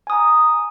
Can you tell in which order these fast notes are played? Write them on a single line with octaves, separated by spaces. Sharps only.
G#5 D#6 A#5